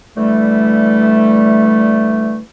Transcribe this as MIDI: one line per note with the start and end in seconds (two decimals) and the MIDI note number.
0.17 2.41 50
0.17 2.41 52
0.17 2.41 55
0.17 2.41 57